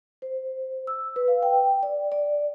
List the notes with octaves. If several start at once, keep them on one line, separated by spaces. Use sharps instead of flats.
C5
E6
B4
F5
G5
D5
D5